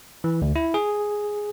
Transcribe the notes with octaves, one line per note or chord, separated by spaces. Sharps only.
E3
D2
E4
G#4